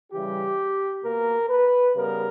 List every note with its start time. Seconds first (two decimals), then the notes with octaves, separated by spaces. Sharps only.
0.12 C#3 E3 G3 G4
1.03 B2 A#3 A#4
1.49 B4
1.94 C#3 G3 B3 A#4